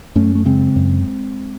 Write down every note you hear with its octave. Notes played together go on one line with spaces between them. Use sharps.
F#2 A3 C#4
A3
C#3 G#3 C4
F#2